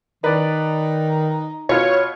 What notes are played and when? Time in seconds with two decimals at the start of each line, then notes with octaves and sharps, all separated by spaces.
0.24 D#3 D#4 B4 D5
1.69 B2 F4 C#5